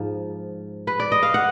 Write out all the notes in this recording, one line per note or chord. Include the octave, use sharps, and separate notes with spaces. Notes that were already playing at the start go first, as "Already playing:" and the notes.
Already playing: G#2 F3
B4
D5
D#5
F5
F#5